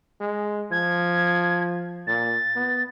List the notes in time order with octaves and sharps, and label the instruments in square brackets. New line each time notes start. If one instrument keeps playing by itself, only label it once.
[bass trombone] G#3
[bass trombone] F3 [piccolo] G#6
[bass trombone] A#2 [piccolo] A6
[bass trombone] B3